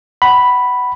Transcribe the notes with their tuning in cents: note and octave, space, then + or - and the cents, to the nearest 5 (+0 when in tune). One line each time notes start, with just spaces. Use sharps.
F#5 +25 B5 +0